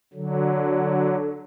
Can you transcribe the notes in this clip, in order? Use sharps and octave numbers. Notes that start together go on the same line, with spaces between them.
D3 F#3